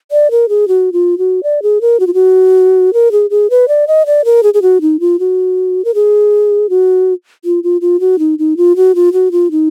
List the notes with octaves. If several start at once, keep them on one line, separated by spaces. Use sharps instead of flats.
D5
A#4
G#4
F#4
F4
F#4
D5
G#4
A#4
F#4
F4
F#4
A#4
G#4
G#4
B4
D5
D#5
D5
A#4
G#4
G#4
F#4
D#4
F4
F#4
A#4
G#4
F#4
F4
F4
F4
F#4
D#4
D#4
F4
F#4
F4
F#4
F4
D#4